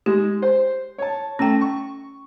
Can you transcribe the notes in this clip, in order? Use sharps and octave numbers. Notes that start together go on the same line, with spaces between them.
G#3 G4
C5
C#5 A5
A3 C#4 G5
C#6